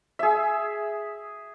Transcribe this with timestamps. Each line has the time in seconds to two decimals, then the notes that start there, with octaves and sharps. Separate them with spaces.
0.19 G#4 E5